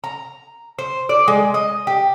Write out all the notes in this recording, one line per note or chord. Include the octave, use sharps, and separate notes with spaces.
A#5
C5
D5
G#3
D#5
G4